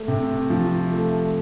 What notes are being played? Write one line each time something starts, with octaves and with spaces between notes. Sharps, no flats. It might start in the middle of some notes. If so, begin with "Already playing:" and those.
Already playing: A3
C3
F3
A3